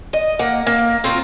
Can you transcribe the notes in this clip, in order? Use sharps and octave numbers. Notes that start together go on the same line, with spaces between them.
D#5
A#3 F#5
A#3
C4 F4 F#4 A#4